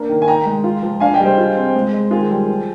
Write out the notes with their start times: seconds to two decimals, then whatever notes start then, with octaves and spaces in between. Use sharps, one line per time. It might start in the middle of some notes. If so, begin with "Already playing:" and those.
Already playing: A#3 D4
0.09 D#3
0.22 G#5
0.27 D#4 G5 A#5
0.46 G#3
0.64 F4
0.82 F3
1.00 D4 F5 G#5
1.14 D#5 G5
1.20 G3
1.25 G#4 C5
1.38 F4
1.57 C4
1.75 G#3
1.93 G#3
2.11 D#3 F4 G#4
2.30 G3
2.48 F3